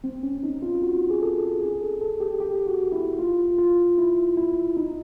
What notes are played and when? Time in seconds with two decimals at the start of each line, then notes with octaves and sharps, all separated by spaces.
0.04 C4
0.23 C#4
0.43 D#4
0.62 F4
0.82 F#4
1.10 G#4
1.22 A4
1.61 G#4
1.81 A4
2.01 A4
2.20 G4
2.40 G4
2.67 F#4
2.92 E4
3.19 F4
3.58 F4
3.98 E4
4.37 E4
4.77 D#4